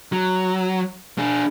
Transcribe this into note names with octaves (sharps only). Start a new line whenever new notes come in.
F#3
D4 G#4